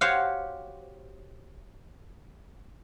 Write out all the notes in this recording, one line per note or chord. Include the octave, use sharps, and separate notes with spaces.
F#4 G4 C5 C#5 F5 F#5